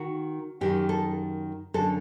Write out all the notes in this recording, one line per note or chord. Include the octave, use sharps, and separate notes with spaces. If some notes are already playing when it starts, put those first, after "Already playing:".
Already playing: D#3 F#4
F#2 D#3 G4
A4
F#2 D3 A4